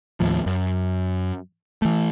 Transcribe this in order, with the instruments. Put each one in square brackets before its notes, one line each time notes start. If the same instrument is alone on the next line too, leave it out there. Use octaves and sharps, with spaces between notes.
[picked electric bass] D#2 A2 F3
F#2
E3 A3